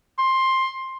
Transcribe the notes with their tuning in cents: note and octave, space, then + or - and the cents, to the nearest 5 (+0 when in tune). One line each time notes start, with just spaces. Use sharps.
C6 +15